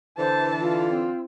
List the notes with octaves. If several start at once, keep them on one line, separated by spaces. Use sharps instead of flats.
D3 E3 C5 A5
F4
C4